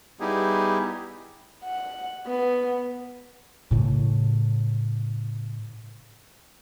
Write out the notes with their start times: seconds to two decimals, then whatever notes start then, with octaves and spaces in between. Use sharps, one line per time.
0.20 G3 B3 D#4 E4 G4 G#4
1.64 F#5
2.27 B3
3.71 A2 C#3